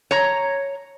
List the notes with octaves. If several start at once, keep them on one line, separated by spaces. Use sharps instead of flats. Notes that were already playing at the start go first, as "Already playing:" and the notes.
C#5 A#5